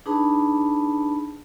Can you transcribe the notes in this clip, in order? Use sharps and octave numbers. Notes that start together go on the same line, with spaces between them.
D4 D#4 G#4 B4 A5 B5